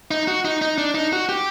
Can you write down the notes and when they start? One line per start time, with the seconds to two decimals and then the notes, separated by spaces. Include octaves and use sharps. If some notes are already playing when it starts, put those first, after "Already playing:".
0.11 D#4
0.27 F#4
0.45 D#4
0.62 D#4
0.78 D4
0.95 D#4
1.13 F#4
1.29 G4